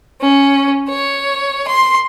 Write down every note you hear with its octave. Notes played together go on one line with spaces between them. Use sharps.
C#4
C#5
C6